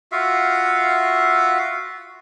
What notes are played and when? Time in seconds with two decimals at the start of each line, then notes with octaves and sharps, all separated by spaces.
0.12 F4 F#4 E5 F5